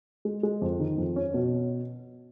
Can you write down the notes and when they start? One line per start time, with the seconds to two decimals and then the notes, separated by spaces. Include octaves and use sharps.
0.25 G#3
0.43 G#3
0.62 F2
0.80 D#3
0.98 F2
1.16 C#4
1.34 B2